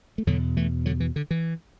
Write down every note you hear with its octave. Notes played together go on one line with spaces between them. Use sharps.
A3
E2 B2 D3 F#3
E3 A3
D3 F#3
E3
D3
E3